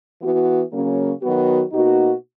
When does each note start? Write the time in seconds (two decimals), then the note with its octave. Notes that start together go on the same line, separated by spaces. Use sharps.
0.21 E3 B3 F#4
0.72 C#3 F#3 A#3 C#4
1.22 D#3 F#3 B3 F#4
1.72 B2 A#3 D#4 F#4